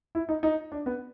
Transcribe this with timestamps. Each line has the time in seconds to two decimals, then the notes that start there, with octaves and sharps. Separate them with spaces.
0.15 E4
0.29 D#4
0.43 D#4
0.72 D4
0.86 B3